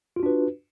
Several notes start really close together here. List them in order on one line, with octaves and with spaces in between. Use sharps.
F4 F#4 D4 B4